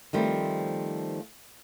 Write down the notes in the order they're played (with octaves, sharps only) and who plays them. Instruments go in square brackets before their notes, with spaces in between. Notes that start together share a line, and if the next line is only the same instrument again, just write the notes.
[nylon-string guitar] D#3 F3 G3 A3 C4